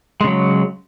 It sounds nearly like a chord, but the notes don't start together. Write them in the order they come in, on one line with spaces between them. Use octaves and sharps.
G#3 C#3 F#3